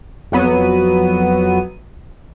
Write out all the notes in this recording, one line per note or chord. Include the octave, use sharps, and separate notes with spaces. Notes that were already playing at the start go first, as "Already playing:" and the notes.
F2 F#3 B3 D#7